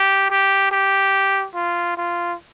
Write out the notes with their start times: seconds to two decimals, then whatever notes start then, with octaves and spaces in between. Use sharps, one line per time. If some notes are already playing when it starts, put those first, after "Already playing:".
Already playing: G4
0.31 G4
0.71 G4
1.55 F4
1.97 F4